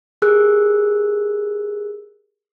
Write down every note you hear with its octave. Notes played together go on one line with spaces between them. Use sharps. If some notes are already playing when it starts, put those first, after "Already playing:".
G4 G#4 A#4 E6 F#6